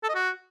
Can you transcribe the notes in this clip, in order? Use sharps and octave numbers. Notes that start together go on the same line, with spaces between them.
A4
D#5
F#4